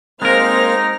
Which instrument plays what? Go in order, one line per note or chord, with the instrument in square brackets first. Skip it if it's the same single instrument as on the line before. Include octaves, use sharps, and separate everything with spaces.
[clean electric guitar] G#3 A#4 [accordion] A#3 C5 [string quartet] C4 F6 A#6 [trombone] D#4